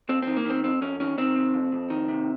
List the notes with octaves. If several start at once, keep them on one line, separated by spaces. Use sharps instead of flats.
F2 C4
D#3 C4
A#3
D#3 C4
F2 C4
F2 C#4
D#3 C#4
D#3 C4
C3
F2
F2
D#3
C3